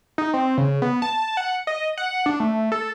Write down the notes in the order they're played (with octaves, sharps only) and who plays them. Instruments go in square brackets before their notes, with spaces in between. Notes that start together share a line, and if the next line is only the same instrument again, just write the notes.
[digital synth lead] D#4
C4
C#3
B3
A5
F#5
D#5
F#5
D4
A3
A4